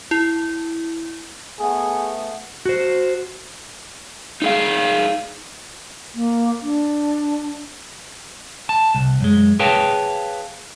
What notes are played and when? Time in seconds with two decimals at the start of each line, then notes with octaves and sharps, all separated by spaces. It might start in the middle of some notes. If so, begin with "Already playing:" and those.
0.11 E4
1.60 A3 B3 G#4
2.65 F#4 C5
4.42 D#4 G#4 F5
6.14 A#3
6.62 D4
8.69 A5
8.95 C2
9.21 F#2 G#3
9.59 G#4 B4 C#5 F5 G5 A5